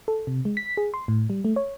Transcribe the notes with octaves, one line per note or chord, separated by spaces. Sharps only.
A4
C3
G#3
B6
G#4
C6
A2
G3
A3
C#5